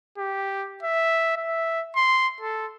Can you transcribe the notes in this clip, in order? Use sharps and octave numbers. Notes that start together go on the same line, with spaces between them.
G4
E5
E5
C6
A4